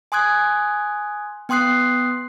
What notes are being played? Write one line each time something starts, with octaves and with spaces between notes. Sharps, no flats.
G#5 C6 D#6 F#6 G#6
B3 G5 C6 D#6 F#6 C7